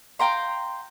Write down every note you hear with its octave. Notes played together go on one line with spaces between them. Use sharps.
F5 G5 A#5 C6